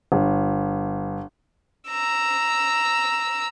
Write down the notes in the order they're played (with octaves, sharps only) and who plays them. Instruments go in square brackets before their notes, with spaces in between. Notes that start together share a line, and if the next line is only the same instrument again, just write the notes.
[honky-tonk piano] G1
[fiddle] A#5 E6